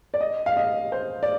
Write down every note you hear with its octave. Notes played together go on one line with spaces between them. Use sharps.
D5
D#5
F5
D#5
C5
D5